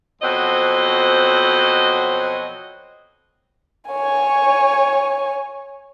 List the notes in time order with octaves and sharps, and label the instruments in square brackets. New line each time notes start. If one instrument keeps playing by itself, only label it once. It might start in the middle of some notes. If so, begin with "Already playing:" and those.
[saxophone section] F2 B2 F#3 C4 F#4 D#5
[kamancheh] C#5 G#5